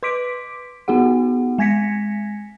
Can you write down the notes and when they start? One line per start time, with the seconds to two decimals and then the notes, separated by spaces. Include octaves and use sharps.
0.03 B4 C6 D6 B6 D7
0.88 B3 D#4 F#4 G#4 F#5
1.58 G#3 G#5 G#6 A#6 B6 C#7